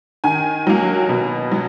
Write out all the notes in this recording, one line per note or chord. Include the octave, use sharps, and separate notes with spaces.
D#3 G#5
F#3 A#3
B2
F#3